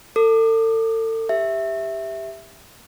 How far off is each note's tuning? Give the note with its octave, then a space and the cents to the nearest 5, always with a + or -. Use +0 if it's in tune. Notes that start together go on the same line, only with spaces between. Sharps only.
A4 +35 D6 +30
G4 +15 E5 +0